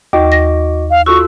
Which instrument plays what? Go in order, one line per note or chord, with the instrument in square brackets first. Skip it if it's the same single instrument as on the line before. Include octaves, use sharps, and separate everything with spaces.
[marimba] D#2 [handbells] F#4 D#5 D6
[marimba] A#6
[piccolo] F5
[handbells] F4 A4 E6 [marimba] F#4 [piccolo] C#6